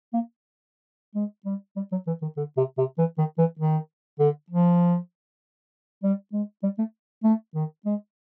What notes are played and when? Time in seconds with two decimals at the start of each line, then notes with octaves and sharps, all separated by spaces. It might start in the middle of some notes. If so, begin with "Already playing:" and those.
0.13 A#3
1.15 G#3
1.45 G3
1.76 G3
1.92 F#3
2.07 E3
2.22 D#3
2.37 D3
2.57 C3
2.78 C3
2.98 E3
3.18 D#3
3.38 E3
3.59 D#3
4.19 D3
4.50 F3
6.03 G3
6.33 G#3
6.63 G3
6.78 A3
7.24 A3
7.55 D#3
7.85 G#3